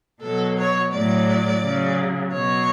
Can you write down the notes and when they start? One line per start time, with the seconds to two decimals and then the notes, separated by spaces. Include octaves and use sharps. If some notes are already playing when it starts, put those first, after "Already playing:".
0.22 B2 F#3 A4
0.57 C#5
0.93 A2 F#3 D5
1.62 C#3 F#3
2.32 B2 F#3 C#5